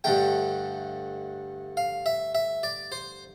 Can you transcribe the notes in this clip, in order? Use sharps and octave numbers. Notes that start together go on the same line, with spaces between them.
G2 D3 A3 G5
F5
E5
E5
D5
C5